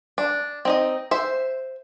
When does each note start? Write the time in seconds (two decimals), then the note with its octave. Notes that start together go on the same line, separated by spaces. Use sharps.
0.18 D4
0.65 C4 D#4 D#5
1.11 C5 E5